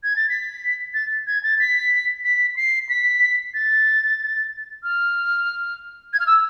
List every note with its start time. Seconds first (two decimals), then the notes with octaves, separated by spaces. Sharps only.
0.03 G#6
0.16 A6
0.29 B6
0.94 A6
1.27 G#6
1.43 A6
1.60 B6
2.24 B6
2.57 C7
2.89 B6
3.54 A6
4.83 F6
6.13 G#6
6.20 F6
6.27 E6